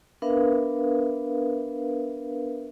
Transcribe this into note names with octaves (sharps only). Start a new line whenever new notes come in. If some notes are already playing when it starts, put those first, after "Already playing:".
B3 D4 A#4 B4 E5 F5